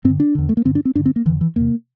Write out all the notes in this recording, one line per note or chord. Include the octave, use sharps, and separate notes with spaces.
G2 C4
D3
D4
E2 D3
A3
A#3
G2 D3 C4
D4
C4
G2 D3 D4
C4
A#3
F2 D3 E3
E3
E2 C3 A#3